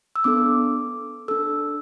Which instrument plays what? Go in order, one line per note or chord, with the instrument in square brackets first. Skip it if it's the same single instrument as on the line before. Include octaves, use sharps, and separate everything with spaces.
[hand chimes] E6
B3 D4 A4 D6
D4 A4 E6